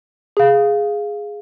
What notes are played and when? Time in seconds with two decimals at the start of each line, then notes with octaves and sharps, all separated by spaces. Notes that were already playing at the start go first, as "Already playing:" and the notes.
0.37 G#4 F5